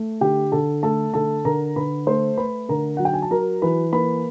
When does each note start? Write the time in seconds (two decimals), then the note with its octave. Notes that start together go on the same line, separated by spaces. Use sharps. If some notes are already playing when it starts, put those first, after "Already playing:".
Already playing: A3
0.21 D3 G4 G5
0.52 D3 A4 A5
0.83 A3 A4 A5
1.14 D3 A4 A5
1.45 D3 A#4 A#5
1.76 D3 B4 B5
2.07 A3 C5 C6
2.37 A3 B4 B5
2.69 D3 A#4 A#5
2.97 F#3 F#5
3.05 G5
3.14 G#5
3.22 A5
3.31 F#3 A#4 A#5
3.62 E3 B4 B5
3.92 A#3 B4 B5